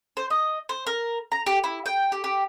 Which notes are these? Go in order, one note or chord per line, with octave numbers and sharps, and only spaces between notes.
C5
D#5
C5
A#4
A#5
G4
E4
G5
G4
G4